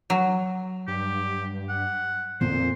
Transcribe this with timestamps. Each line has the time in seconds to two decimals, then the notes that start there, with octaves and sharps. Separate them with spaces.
0.10 F#3
0.88 G2 G4
1.69 F#5
2.41 F2 A#2 C4 C5